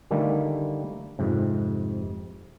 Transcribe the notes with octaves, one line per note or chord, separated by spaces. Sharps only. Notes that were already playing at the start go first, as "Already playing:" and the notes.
D3 D#3 G3 A3 A#3
F2 G#2 C3